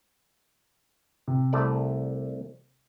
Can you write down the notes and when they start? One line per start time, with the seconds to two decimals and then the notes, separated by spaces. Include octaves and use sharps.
1.28 C3
1.53 C2 A3 D5